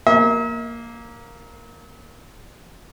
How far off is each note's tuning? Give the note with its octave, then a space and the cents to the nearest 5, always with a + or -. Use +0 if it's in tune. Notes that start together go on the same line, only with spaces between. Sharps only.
A#3 +0 E5 -45